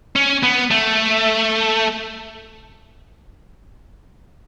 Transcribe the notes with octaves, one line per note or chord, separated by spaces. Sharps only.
C#4
B3
A3